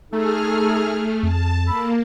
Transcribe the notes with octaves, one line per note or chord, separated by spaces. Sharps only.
A3 D#4 G#4 A4 F6
F2 A5
A#3 A4 B5